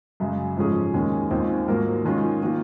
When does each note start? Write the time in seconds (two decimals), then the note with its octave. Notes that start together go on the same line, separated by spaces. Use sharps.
0.20 F#2 C#3 G#3
0.57 G#2 F3 G#3 C#4 G#4
0.94 D#2 D#3 G#3 C#4
1.31 D#2 D#3 G#3 C4 F4
1.68 G#2 F#3 A#3 F4 A#4
2.05 D#3 G#3 C#4 F4
2.43 D#3 A#3 F4